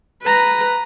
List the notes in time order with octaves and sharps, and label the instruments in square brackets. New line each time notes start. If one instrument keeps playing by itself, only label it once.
[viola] B4 A#5